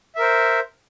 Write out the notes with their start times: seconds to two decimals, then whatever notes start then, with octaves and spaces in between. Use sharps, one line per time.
0.15 E5
0.19 A#4
0.22 C5